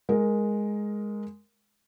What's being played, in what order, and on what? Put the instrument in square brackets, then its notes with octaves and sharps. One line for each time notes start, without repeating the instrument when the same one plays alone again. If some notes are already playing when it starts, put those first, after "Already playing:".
[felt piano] G#3 A#4